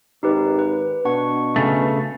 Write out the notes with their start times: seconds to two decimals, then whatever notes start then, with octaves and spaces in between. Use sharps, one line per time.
0.23 G#1 D#4 G4 B4
0.59 B4
1.05 B2 D4 F#5 C#6
1.56 C#3 A3